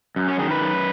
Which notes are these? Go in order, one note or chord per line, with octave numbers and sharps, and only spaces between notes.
F#2
C#4
D#3 G#4
B4
F#2